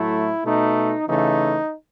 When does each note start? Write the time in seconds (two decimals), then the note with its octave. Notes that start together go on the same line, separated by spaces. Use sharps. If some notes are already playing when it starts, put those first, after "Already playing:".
Already playing: A2 F#3 A3 E4
0.45 B2 A3 D#4
1.08 C#3 E3 A3 D#4